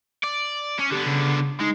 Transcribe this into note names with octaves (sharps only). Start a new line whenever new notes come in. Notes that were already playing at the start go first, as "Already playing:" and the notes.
D5
C#4
D3 B3 G4
C#3
G#3 D#4